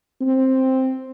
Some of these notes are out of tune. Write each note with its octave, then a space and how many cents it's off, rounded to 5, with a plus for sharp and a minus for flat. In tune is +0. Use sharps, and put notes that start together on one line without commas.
C4 +5